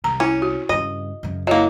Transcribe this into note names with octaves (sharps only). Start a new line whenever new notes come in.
C2 A#5
C#4 E4
F#4
G2 C#3 D#5
F#2 C#3
F#3 A#3 E4 D#5